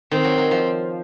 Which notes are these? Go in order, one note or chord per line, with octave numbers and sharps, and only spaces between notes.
D#3 C4
F#3
F#3
F3